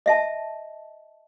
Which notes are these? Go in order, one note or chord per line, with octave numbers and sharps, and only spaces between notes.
D#5 E5 A5